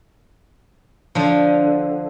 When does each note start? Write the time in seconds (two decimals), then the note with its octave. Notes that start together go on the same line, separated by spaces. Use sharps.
1.15 D3 F3